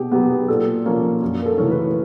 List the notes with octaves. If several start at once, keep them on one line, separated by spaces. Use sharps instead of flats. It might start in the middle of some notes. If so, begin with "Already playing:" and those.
Already playing: B2 G4 G#4
F#3 B3 G4
G#4
A#2 A4
F3 A#3 C#4
F#2
A#4
A4
C#3 E3 A3 C#4
B4